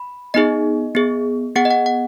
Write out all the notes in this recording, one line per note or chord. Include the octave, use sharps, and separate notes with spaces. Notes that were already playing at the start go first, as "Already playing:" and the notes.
Already playing: B5
B3 D#4 G#4 D#5
B3 G#4
B3 G#4 F#5
D#5
F#5
F#5